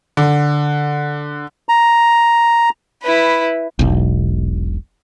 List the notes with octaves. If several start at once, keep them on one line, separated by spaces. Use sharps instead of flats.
D3
A#5
E4 B4
E1 B1